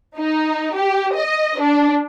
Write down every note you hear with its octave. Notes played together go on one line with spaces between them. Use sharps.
D#4
G4
D#5
D4